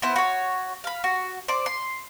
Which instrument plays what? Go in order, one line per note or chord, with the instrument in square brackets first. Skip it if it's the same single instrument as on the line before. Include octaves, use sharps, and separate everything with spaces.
[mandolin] B3 E4 C5
F#4 C#5
F5 B5
F#4
C5 D5 D6
C6